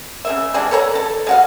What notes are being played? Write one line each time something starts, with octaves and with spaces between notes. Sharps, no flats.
C#3 A#3 E5
E3 G3 G#3 D4
A4 B4 C#5 A#5
A4
G#3 F#4 F5